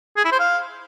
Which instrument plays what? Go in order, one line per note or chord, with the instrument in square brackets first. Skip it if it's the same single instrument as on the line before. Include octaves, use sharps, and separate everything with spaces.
[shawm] G#4
E4
C5
F5